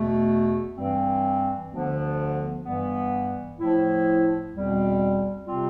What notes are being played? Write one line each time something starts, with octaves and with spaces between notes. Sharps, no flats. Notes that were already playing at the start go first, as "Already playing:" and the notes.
Already playing: E2 B2 A3
G2 E3 G3 C4
D2 D3 F3 B3 D4
G2 E3 G3 B3
A2 F3 A3 E4
E2 B2 G3 C4
C3 G3 C4 F4